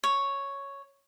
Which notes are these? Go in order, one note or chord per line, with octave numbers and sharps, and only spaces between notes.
C#5